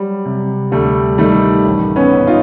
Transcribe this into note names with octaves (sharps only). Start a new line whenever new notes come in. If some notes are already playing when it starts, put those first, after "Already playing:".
Already playing: F#3 G3
C3
D2 G3 A3
D#3 G3 A3
A1
B3 C#4
G#2
D#4 F4